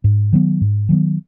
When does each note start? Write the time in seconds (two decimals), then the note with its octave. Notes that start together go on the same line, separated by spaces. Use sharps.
0.04 G#2
0.33 D#3 F#3 B3
0.61 G#2
0.89 D#3 F#3 B3